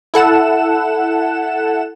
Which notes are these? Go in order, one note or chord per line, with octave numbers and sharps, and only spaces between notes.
E4 A4 F#5 E7